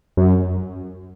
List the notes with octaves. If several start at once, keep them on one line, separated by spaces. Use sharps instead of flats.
F#2